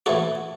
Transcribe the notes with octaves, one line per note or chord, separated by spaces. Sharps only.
A2 E3 F#4 A4